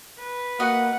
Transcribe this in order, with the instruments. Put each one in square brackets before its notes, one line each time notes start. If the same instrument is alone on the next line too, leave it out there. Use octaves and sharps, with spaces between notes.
[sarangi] B4
[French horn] A#3 [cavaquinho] F#4 D#5 [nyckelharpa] F#5